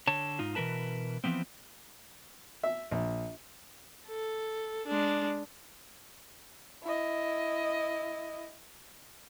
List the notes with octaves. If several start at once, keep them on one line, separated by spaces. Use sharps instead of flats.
D3 C#5 A5
G#2 D#4 F4
B2 E3 A#3 A#4 B4 A5
E3 F3 B3 C4
E5
A#1
A4
G#3 D4
E4 D#5